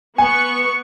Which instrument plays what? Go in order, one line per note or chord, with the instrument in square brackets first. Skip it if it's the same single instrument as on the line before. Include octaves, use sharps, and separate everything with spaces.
[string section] B3 C#6 [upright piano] G#5